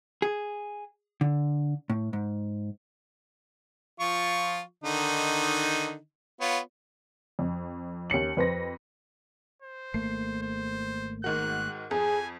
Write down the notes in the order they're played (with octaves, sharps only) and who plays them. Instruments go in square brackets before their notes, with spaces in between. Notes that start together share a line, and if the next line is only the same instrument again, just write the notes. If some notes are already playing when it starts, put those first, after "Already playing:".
[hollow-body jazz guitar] G#4
D3
A2
G#2
[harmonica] F3 F4 C#6
D3 D#3 D#4
B3 F4 C#5
[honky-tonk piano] F2
D#2 C#4 C#7 F#7
F2 B4 C5 A#6
[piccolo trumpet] C5
[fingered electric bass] G#1 A3 A#3 [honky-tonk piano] C7
[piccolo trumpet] C5
[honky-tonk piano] G#2 D#3 F#4 [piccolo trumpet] F#6
[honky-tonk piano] F2 [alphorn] G#4 [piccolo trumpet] G#5